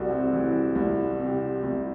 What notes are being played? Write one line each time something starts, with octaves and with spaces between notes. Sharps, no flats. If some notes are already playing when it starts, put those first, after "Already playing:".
Already playing: C2 C3 F#4 A4
C4
E3
C2
C3
C2